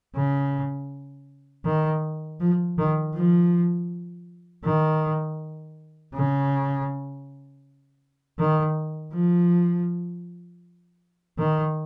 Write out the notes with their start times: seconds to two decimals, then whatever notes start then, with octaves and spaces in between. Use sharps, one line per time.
0.16 C#3
1.65 D#3
2.40 F3
2.78 D#3
3.14 F3
4.64 D#3
6.14 C#3
8.39 D#3
9.13 F3
11.38 D#3